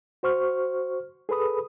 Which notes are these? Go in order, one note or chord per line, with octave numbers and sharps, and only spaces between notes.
F#4 C5 C#6 F6
G#4 A4 B4 B5 D#6